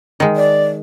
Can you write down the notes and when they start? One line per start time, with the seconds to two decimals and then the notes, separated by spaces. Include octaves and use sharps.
0.20 D#3 G#3
0.36 D5